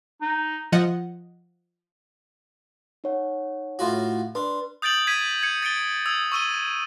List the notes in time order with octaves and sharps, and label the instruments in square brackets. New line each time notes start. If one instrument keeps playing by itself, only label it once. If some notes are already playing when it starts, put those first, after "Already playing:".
[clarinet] D#4
[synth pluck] F3 D#5 F#5
[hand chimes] D#4 C#5 F#5
[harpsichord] A2 F4 F#4
[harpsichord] D4 [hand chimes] B4 C6
[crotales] D#6 G6 A6 D7 F#7
G#6 B6 D#7
G#6 C#7
A6 C#7 D7 G7
D#6 E6 G#6
C#6 E6 D#7 G7